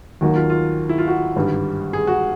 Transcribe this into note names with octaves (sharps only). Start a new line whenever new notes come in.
D#2 D#3 F#3 A#3 F#4
F4
F4
E4
F4
F#4
G#1 G2 D3 G3
G#4
F#4